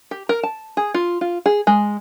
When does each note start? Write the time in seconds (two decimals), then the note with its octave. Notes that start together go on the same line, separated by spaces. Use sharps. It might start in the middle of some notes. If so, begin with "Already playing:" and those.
0.11 G4
0.29 A#4
0.43 A5
0.77 G#4
0.94 F4
1.21 F4
1.46 G#4
1.67 G#3